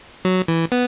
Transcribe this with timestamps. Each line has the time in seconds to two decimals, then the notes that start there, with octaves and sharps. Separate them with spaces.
0.25 F#3
0.48 E3
0.72 B3